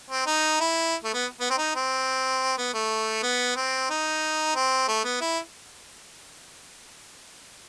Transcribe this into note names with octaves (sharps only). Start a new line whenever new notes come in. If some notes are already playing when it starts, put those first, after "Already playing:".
C4
D#4
E4
A3
B3
B3
C4
D#4
C4
B3
A3
B3
C4
D#4
C4
A3
B3
E4